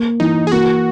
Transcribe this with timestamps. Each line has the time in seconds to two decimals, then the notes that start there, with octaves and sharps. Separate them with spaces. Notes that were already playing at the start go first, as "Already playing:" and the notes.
Already playing: A#3
0.20 E3 D#4
0.47 G#4
0.52 A#3 F#4